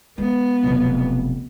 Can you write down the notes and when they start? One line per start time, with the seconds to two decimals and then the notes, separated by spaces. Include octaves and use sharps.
0.18 G#3 B3
0.63 F1 B1